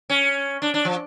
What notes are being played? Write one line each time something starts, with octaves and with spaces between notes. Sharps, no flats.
C#4
D4
D4
F3